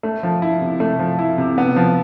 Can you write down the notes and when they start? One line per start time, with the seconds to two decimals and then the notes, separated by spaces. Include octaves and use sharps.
0.03 A3
0.23 F3
0.42 E4
0.61 C3
0.80 A3
0.99 F3
1.19 E4
1.38 C3
1.58 B3
1.76 F3